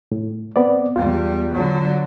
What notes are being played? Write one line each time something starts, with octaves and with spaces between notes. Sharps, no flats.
A2
B3 C4 D5
E2 G3 F4
D3 F#3